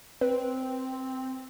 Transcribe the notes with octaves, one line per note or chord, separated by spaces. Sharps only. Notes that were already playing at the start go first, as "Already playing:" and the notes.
C4 B4